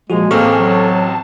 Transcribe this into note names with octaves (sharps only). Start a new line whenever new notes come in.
A#2 F3 G#3 F#4 G#4
A1 A#3 C4 G#4 A4 C#6 F6
F#3
A5